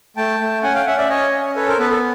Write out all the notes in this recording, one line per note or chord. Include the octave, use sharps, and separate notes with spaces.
A3 G5 A5
A3
C#4 F#5 G#5
F5 G5
C#4 E5 F#5
D5 E5
C#4 C#5 D#5
C#4
A4 B4 C#5
A#4 C5
B3 A4 B4
A4